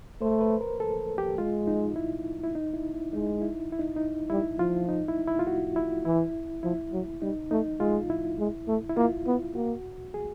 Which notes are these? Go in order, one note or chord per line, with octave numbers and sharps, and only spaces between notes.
A3 C5
B4
A#4
A4
G4
G#3 F4
D#4
E4
E4
D#4
E4
E4
G#3 D#4
E4
E4
D#4
D#4
G3 E4
F3 F4
D#4
E4
E4
F4
F#4
E4
E3 E4
F3 E4
F#3
G3 D#4
A3 D#4
G#3 F4
E4
G#3
A3
E4
A#3 F4
B3
A#3 F#4
G#4